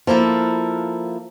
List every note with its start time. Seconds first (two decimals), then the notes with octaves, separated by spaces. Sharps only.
0.07 F3 A#3 E4 A4